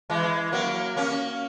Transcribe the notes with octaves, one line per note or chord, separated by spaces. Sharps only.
E3 G#3
F#3 A#3
A#3 C#4